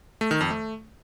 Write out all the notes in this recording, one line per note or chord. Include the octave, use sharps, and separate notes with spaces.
A3
D#3
F2
A3